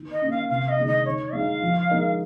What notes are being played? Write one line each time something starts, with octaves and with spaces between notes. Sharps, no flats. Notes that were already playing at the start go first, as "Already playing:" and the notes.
Already playing: D#3
D#5
A#3 C#4
F5
C3 F5
D#5
D#3 G#3 D#4
D#5
D#3 C#5
G#3 D#4 F5
F3
G#3 D#4 A#4 D#5